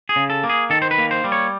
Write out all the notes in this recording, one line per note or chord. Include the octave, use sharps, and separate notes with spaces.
G#4
C#3
A4
A#3
G#4
D#3 A4
C5
B4
A#3
C5
G3
C#5